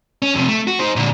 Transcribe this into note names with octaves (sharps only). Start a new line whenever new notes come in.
C#4
F2 C3
A3
F#4
D#4 C5
A#2 D3